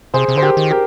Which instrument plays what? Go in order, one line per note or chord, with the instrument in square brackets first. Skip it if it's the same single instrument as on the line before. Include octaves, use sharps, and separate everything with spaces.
[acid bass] C3 [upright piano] G#4 C5
[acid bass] C3
[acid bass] D3 [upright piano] C5
[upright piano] G4 A#4
[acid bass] D#3
[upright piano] G4 A#4